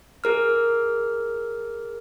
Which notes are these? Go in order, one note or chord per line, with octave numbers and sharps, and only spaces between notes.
G#4 A#4 F6